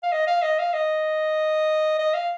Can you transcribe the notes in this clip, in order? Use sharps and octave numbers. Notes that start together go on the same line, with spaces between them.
F5
D#5
F5
D#5
F5
D#5
D#5
F5